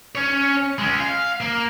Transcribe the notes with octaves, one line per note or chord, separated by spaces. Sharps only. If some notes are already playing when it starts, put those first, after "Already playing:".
C#4 C#5
G#3 C#4
F5
A#3